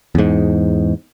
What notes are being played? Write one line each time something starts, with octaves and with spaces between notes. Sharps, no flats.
E2 G#2